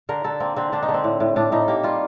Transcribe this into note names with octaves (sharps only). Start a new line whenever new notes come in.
D3 A#4
D3 A4
A#3 C4
D3 C4
D3 D4
D#4
D3
C4
A2
A2
A2 D4
A2 D#4
A#3 G4
G3 F4